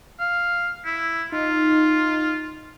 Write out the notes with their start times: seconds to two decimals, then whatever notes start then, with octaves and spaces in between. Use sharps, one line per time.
0.20 F5
0.85 E4
1.32 D#4 F4